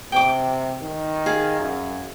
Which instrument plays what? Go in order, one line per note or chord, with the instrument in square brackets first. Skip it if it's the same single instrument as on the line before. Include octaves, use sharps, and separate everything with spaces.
[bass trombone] C3 [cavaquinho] G5 D6
[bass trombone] D#3
[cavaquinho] G#4 F5
[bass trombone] F#2